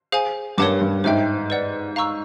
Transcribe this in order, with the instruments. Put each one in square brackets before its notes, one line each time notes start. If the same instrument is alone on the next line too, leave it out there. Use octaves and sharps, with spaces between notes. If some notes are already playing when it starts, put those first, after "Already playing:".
[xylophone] G#4 C5 F5 G#5
[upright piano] G2 [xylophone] A#4 C#5 F#5 A5 D6
[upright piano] G2
[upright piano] G#2 [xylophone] C5 E5 G5
[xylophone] B4 D5 F#5
F5 A#5 C#6 E6